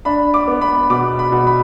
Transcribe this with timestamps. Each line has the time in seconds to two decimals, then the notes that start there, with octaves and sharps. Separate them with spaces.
0.05 D4 B5
0.34 D6
0.48 B3
0.61 B5
0.90 B2 D6
1.19 B5
1.32 B2
1.47 B5